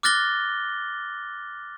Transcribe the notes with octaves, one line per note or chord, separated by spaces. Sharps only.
D6 F6 F#6 A6 A#6 G7